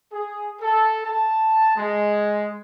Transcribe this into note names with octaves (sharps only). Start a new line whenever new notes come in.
G#4
A4
A5
G#3